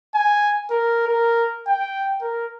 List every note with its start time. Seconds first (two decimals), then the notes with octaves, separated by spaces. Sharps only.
0.15 G#5
0.70 A#4
1.07 A#4
1.67 G5
2.22 A#4